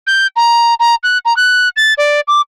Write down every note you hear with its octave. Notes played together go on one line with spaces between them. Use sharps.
G6
A#5
A#5
F#6
A#5
F#6
A6
D5
D6